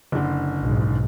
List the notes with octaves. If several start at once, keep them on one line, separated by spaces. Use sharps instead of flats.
F#1 D3
B1 G#2